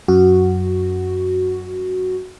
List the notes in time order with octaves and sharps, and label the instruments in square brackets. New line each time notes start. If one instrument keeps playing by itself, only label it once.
[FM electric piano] F#2 F#4